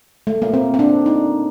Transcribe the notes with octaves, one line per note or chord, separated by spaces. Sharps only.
A3
A#3
C4
C4
D4
D#4